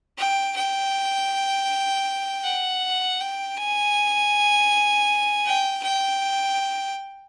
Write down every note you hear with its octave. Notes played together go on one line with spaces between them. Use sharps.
G5
G5
F#5
G5
G#5
G5
G5